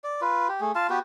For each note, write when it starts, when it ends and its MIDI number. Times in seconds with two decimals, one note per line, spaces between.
0.04 0.21 74
0.22 0.48 65
0.22 0.48 71
0.49 0.61 67
0.61 0.72 57
0.61 0.72 68
0.75 0.87 65
0.75 0.87 77
0.75 0.87 81
0.90 0.99 59
0.90 0.99 66
0.90 0.99 67
0.90 0.99 71